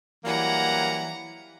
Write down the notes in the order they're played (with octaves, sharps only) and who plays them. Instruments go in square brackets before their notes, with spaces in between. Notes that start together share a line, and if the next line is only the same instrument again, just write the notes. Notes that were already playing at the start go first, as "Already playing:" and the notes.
[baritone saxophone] E3 [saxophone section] F#3 G3 A#3 [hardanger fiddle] F#5 A#5